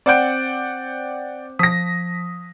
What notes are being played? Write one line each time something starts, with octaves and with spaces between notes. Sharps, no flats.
C4 C5 D5 F#5 G5 D6
F3 D#6 A#6 B6